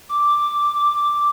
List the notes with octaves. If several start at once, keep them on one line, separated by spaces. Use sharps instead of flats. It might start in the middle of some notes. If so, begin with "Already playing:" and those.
D6